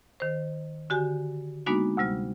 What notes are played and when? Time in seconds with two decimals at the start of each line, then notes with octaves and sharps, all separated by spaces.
0.20 D#3 C5
0.90 D3 F#4 G4 G#5
1.67 G#3 A#3 B3 D4 D#4 F#4
1.97 D2 C3 G3 F6